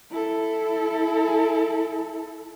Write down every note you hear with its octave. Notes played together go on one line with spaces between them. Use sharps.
E4 A4